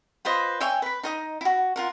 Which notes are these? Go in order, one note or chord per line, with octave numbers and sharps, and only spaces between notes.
F4 B4 C5 D#5
C#5 E5 G5 G#5
B4 B5
D#4 D#5 D#6
E4 F#4
F4 A#4 F#5